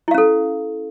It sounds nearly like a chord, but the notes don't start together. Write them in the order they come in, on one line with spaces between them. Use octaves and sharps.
E4 F5 C#4 A4